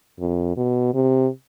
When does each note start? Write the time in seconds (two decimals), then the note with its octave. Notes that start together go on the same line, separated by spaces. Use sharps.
0.20 F2
0.57 B2
0.94 C3